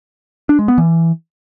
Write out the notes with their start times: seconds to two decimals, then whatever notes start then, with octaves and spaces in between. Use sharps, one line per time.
0.49 D4
0.59 G#3
0.68 B3
0.78 E3